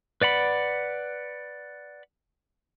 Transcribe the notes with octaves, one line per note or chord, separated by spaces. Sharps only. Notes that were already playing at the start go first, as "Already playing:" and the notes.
B4 D5 F#5 B5